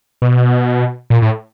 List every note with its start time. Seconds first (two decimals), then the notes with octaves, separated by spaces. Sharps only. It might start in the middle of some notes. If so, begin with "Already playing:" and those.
0.22 B2
1.10 A#2
1.22 A2